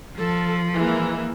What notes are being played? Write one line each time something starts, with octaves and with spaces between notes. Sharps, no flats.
F3 A4
E3 G#3 A#3